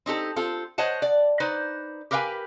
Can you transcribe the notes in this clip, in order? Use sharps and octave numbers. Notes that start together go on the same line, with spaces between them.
C4 D#4 G4 A4
C4 F4 A4
C5 C#5 D#5 F#5 A5
D5
D#4 B4 C5 D5
G4 A#4 B4 F5 G5 G#5